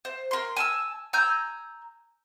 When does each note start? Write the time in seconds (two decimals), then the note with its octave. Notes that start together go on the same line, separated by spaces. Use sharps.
0.05 C5
0.31 A#4 C6
0.57 G#5 A5 E6
1.13 G#5 A#5 E6 G6